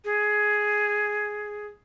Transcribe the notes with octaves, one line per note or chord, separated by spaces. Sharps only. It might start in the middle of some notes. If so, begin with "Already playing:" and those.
G#4